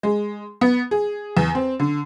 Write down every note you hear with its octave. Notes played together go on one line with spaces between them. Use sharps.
G#3
B3
G#4
E2
C4
D3